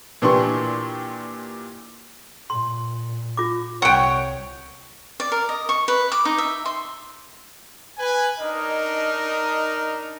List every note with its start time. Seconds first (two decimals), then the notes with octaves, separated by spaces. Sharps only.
0.22 A#2 E3 D4 G4 C6 C#6
2.50 A#2 C6
3.37 F4 D6
3.82 C2 C#5 F#5 G5
5.20 D5
5.32 A#4
5.49 D#5
5.69 C#6
5.88 B4
6.12 D6
6.25 D#4
6.38 E5
6.66 C6
7.98 B4 G#5
8.40 D4 D#4 A#4 D#5